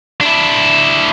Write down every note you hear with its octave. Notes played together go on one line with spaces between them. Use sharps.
D4 E4